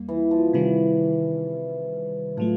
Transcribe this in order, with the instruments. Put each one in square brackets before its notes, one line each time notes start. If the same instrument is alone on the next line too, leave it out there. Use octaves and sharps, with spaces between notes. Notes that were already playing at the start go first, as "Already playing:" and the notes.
Already playing: [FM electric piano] E2 G3 A#3
[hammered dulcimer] E3
F3
[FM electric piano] C3 D#3 G3 [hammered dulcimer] E3
[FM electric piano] A2 F#3 A3 [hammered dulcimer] F3